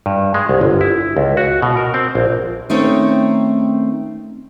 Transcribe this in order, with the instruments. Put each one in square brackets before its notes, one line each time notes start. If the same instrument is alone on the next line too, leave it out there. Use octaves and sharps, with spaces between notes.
[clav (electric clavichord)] G2
G#3
C2
G1
E4
C#2
F#4
B2
A#4
C4
A#1
[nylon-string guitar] D#3 A3 C4 C#4 D#4 C#5